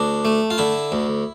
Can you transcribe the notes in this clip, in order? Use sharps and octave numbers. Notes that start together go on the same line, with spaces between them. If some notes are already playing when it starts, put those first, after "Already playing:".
Already playing: D2 D4
A3
F4
D3 E4
D2